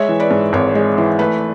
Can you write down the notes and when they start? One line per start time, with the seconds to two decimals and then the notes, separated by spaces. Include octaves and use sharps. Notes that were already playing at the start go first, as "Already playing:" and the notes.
Already playing: G#3 C#5 E5
0.09 E3
0.20 B4 D5
0.31 G#2
0.53 G#1 C#5
0.75 G#3
0.98 E3
1.19 A3 B4